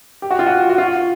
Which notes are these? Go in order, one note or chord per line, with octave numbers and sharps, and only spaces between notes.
G4
F#4
F4
F#4
F#4
F4